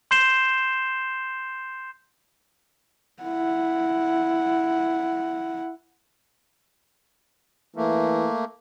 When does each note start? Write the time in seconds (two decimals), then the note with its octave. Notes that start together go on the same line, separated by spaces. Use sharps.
0.11 C6 G6 C7 E7 G7
3.22 E4 F#5
7.76 E3 A3 A#3